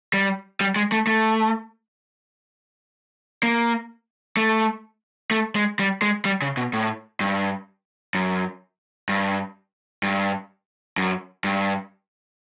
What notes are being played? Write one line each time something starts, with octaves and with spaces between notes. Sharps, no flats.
G3
G3
G#3
A3
A3
A#3
A3
A3
G#3
G3
G#3
G3
C#3
B2
A2
G2
F#2
G2
G2
F#2
G2